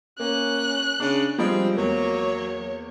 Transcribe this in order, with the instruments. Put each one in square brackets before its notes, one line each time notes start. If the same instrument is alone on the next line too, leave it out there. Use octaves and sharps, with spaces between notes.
[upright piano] A#3 [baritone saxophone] C#4 [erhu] F#6
[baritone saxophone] C#3 [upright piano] D4
[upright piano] F3 G3 G#3 [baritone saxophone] C4
[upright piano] E2 A#3 [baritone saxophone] F#3 [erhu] C#5